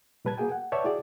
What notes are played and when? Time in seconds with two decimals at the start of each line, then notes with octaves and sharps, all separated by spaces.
0.25 A#2 G3 B4 A5 G#6
0.38 A#3 F#4 G#4 G5 G#5
0.52 F#5
0.72 B4 C#5 D5 E5 G5 A5
0.84 E4 F#4 G#4 D5